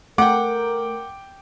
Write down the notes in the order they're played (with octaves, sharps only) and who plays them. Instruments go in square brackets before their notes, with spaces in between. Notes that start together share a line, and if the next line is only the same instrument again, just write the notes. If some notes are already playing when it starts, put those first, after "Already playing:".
[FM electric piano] A3 [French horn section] A#4 [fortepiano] F#5 [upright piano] G5 D6